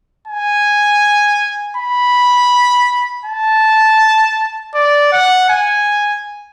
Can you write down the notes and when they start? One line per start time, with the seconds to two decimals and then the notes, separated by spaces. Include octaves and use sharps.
0.28 G#5
1.77 B5
3.25 A5
4.74 D5
5.13 F#5
5.49 G#5